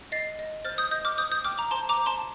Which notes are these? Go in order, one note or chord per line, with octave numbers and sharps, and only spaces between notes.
D#5 A6 C7
D#5
C5 F6 A6
D#6 G6
D#5 D#6 G6
D6 F6
C5 D#6 G6
D#6 G6
G5 D6 F6
A#5 D6
C5 A5 C6
A#5 D6
C5
A5 C6